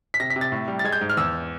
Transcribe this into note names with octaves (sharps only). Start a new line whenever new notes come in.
B6
C3 A#6
B6
C3
A6
A2
G3
A6
G#3 G#6
G6
G#2
F6
E2 E6